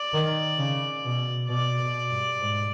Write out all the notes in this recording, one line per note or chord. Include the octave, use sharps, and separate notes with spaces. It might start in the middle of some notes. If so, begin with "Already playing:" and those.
Already playing: D5
D#3
C#3
B2
B2 D5
B2
G2
G#2